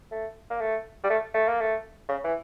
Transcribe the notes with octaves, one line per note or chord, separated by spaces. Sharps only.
A3
A#3
A3
G3
A3
A3
A#3
A3
C#3
E3